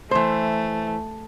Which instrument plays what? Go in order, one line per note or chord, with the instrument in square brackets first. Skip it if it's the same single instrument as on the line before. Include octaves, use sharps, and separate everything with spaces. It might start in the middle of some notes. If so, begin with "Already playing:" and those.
[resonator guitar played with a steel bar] E3 C5 [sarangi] A3